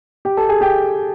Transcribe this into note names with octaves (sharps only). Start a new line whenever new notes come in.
G4 G5
A4 A5
G#4 G#5
G4 G5